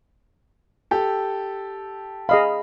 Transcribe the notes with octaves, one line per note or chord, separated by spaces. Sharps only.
G4 A4
G#4 D#5 F5 B5